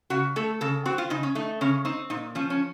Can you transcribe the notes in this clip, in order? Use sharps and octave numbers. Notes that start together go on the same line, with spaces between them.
C#3 F#4
A3 A4
C#3 A4
C4 F#4
F4
C#3 D#4
C#4
A3 D#4
C#3 C#4
C4 D#4
A#2 D#4
F3 C#4
C#4